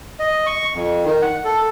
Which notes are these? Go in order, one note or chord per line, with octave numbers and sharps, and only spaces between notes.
D#5
C#6
F2
D#3
F#5
A4